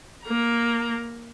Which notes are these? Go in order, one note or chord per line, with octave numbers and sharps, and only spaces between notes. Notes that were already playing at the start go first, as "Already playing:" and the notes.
A#3 A#5